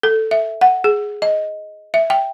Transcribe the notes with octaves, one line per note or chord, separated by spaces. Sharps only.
A4
E5
F#5
G#4
D#5
E5
G5